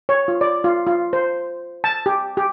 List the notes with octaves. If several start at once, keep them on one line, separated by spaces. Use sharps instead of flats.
C#5
F4
D5
F4
F4
C5
A5
G4
G4